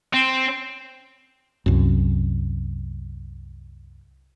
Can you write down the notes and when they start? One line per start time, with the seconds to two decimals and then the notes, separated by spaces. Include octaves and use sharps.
0.13 C4
1.66 C2 F#2